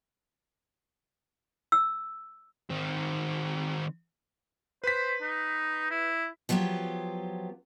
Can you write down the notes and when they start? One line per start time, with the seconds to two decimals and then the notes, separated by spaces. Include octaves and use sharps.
1.72 E6
2.70 D#3 C4
4.84 B4 C5 B6
5.22 D#4
5.91 E4
6.49 F3 F#3 B3 F4 G4